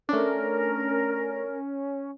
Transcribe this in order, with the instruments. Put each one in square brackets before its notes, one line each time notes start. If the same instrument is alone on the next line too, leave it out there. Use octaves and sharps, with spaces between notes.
[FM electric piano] A3 D4 [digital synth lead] C#4 [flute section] A#4